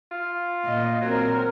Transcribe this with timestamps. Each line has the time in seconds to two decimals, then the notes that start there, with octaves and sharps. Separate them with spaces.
0.11 F4
0.66 A#2 D#5
1.01 F#3 C4 A#4